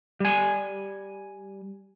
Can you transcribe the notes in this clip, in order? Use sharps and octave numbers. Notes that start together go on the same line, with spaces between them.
G3 G#5